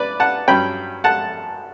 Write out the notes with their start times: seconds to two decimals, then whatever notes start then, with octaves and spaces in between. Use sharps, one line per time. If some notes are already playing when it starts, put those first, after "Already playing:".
Already playing: B4 D5
0.20 F#5 A5
0.48 G2 F#3 C#4 G5 B5
1.04 F#5 A5